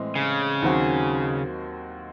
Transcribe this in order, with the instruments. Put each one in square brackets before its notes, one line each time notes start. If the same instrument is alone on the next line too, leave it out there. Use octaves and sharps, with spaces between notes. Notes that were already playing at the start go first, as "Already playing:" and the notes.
Already playing: [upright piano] A2 E3 G#3 C4
[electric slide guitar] C#3
[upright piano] D#2 D#3 F#3 C4 F#4